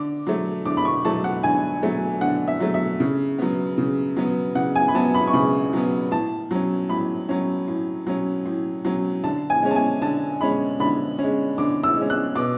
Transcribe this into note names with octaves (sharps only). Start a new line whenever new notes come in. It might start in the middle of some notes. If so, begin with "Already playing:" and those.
Already playing: D3 D6
F#3 A3
D3 D6
B5
C#6
F#3 A3 A5
F#5
D3 G#5
F#3 A3
D3 F#5
E5
F#3 A3
E5
C#3
F#3 B3
C#3
F#3 B3
C#3 F#5
G#5
B5
F#3 B3 A5
B5
C#6
C#3 B5
F#3 B3
A2 A5
F#3 C#4
A2 B5
F#3 C#4
A2
F#3 C#4
A2
F#3 C#4
D3 A5
G#5
G#3 C#4
A5
G#5
D3 A5
G#3 C#4 B5
D3 B5
G#3 C#4
D3 D6
E6
G#3 C#4
F#6
B2 D6